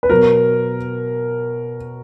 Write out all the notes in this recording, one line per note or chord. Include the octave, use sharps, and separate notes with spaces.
B4
B2 F#3 A#4